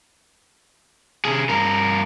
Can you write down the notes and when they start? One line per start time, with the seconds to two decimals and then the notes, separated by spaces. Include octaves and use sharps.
1.25 C3 G#4
1.49 G2 A#4